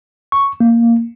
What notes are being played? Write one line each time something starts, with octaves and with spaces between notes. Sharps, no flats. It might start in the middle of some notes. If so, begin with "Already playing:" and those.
C#6
A#3